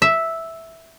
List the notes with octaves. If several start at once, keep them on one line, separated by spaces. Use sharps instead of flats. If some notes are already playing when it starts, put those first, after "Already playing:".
E5